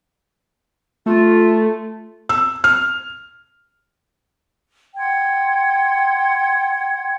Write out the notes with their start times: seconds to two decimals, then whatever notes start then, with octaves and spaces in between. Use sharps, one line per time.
1.06 A3 F4
2.29 E6
2.64 F6
4.97 F#5 G5 C6 G#6